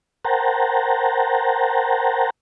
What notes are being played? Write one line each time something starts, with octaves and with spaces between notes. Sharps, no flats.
A#4 C5 F#5 G5 A5 A#5